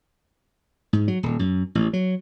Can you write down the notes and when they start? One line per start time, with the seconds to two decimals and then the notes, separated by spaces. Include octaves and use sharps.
0.93 G#2
1.08 F#3
1.23 D#1
1.39 F#2
1.75 A1
1.93 F#3